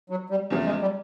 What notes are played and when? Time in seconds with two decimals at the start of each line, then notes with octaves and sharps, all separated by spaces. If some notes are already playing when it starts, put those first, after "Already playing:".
0.10 F#3
0.30 G3
0.50 E2 C#3 F3 A3
0.66 G#3
0.82 G3